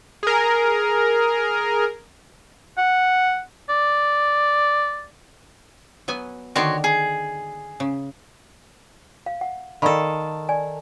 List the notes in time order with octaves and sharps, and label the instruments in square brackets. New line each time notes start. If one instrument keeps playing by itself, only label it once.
[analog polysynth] G#4 A#4
[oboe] F#5
D5
[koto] F#3 B3 G#5
[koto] D3 D#3 D5 [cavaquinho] F#4 C#5 C6
[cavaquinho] G#4
[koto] C#3
[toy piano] F5
F#5
[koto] D#3 A4 [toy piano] D5 F5 B5
[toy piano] D5 G#5